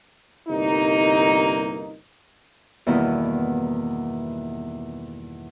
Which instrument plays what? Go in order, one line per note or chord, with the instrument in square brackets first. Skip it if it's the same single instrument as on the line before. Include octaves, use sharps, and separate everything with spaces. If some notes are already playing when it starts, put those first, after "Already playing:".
[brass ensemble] G1 C2 A#3 D#4
[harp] E2 G2 B2 D#3 A#3 E4